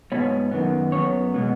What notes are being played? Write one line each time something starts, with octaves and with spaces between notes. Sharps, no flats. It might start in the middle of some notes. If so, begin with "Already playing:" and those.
G#2 D#3 B3 C#5
F#2 D#3 B3
F#2 F#3 B3 C#5
B2 G#3 B3